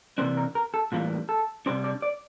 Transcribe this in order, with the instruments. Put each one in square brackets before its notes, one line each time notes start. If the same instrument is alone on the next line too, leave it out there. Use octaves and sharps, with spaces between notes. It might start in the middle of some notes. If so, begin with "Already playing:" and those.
[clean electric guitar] C3 E3 A#3 D4 C5
A#4
A#4
A4
A2 E3 G3 A#3 F4
A4
C3 G3 D4 C5
D5
D5